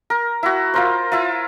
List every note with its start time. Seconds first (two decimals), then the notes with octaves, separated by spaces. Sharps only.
0.10 A#4
0.43 E4 F#4
0.74 F4 A#4 C5
1.12 E4 F4